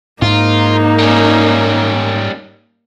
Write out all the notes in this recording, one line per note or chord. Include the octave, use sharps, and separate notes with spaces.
G#2 A#3 D#4 F4
G3 C#4